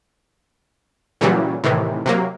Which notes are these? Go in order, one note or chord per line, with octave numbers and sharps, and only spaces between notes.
A#2 C#3 E3 F#3 G3
A2 C3 D#3 E3
C3 F#3 A#3